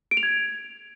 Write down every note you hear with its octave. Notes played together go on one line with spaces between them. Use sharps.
D7
F7
G#6